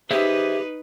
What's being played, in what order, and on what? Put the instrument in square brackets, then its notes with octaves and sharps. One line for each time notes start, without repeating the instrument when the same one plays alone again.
[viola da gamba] D#4 B4 [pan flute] G4 [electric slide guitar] G#4 C5 E5